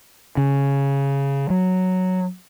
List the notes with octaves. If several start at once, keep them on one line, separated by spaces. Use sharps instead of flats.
C#3
F#3